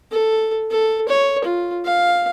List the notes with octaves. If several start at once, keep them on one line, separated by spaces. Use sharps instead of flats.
A4
A4
C#5
F4
F5